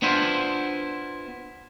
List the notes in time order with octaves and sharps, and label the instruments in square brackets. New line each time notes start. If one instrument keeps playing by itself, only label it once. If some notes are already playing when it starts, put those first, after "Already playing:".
[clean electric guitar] B3 D4 E4 F4 C5